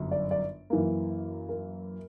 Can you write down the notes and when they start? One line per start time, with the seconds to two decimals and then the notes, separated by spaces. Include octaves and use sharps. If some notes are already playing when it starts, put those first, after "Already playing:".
Already playing: G1 F#2
0.11 D5
0.31 D5
0.70 F#2 E3 A#3
1.49 A#4